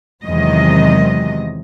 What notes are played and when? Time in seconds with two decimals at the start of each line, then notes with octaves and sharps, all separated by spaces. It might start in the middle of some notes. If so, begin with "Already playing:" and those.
0.24 E2 C3 D#3 F#3 G#3 D#5